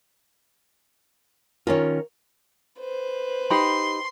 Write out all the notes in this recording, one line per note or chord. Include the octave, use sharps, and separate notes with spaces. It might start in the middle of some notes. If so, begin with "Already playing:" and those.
D#3 C#4 F4 A#4 C#5
B4 C5
D#4 G4 B5 C6